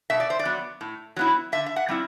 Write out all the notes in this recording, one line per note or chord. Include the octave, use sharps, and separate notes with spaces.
B2 E5
D5
C5
D5
F#3 B3
A2
F#3 B3 E4
D3 E5
E5
F#5
G3 C4 E4